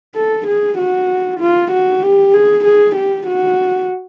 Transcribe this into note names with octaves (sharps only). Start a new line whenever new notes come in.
A4
G#4
F#4
F4
F#4
G4
G#4
G#4
G4
F#4